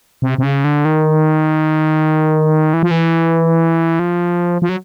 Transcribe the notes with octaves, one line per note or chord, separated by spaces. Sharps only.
C3
C3
C#3
D3
D#3
E3
F3
E3
F3
F3
F#3